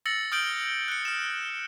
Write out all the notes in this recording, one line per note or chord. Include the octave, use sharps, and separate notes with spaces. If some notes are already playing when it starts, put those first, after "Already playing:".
E6 A6 A#6 C#7 F#7
D#6 F6 G6 D7 F#7 G7
F#6 C#7
F6 E7